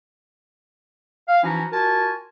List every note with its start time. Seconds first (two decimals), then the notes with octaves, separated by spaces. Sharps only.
1.28 F5
1.43 E3 F3 C#4 D#4 E4 F#4
1.72 F4 F#4 A#4 G#5 A5